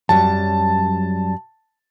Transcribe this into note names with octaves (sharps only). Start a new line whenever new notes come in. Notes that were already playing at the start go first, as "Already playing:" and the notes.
F#2 F#3 G3 A5